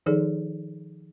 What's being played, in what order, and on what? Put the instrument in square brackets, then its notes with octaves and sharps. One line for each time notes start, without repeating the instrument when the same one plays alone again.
[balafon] D#3 F3 D#4 G#4 A4 D5